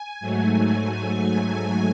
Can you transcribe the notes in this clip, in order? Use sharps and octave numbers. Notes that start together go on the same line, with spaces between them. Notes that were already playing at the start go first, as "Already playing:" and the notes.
Already playing: G#5
G#2 F#3 A3